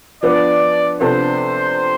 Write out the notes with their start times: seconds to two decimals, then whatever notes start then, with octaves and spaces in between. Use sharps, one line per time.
0.23 F3 B3 D4 D5
1.00 C3 F3 B3 D4 A4 C5